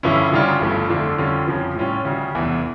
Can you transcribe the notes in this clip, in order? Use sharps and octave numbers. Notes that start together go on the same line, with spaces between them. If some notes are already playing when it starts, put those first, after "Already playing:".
G2 D3 F3 C#4 E4
D2 C#3 G3 D4 F4
G1 G2 F3 A3
F2 D3 A3 D4 F4
F2 D3 G3 C#4 F4
F2 C#3 F3
A2 G3 C#4 F4
D2 C#3 G3
F1 E2 E3